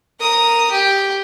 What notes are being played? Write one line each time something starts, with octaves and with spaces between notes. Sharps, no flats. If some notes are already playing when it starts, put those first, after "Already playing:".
A#4 D#6
G4